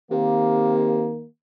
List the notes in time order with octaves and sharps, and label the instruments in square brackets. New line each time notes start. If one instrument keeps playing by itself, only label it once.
[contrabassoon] C3 [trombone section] D#3 A#3